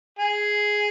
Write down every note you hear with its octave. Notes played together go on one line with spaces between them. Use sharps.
G#4